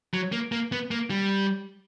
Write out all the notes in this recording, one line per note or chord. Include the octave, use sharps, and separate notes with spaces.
F#3
A#3
A#3
B3
A#3
G3